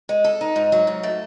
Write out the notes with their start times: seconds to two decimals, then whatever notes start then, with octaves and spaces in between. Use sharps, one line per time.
0.09 G#3
0.24 A4
0.41 D#4
0.56 G#2
0.72 F#3
0.87 G#2
1.03 A3